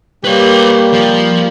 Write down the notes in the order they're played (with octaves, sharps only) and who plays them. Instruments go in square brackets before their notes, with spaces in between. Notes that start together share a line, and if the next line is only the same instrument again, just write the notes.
[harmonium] G3 A#3 [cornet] G4 [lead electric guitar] B4 C#5
[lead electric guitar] F3